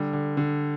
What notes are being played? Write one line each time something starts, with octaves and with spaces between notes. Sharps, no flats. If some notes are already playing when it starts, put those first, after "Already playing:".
Already playing: D3 G3
D3
D3